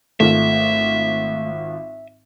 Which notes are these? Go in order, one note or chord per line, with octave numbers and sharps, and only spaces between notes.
G#1 A3 F4 E5